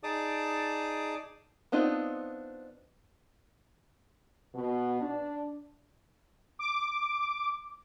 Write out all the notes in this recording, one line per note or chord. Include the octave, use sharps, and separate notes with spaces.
D#4 G#4 D5 A5 D6 D#6
B3 C4 D4 D#4 F4
B2
D4
D6